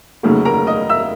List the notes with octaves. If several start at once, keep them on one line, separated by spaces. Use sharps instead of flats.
F1 D#2 C#3 F#3 A3
A#4 A#5
D#5 D#6
E5 E6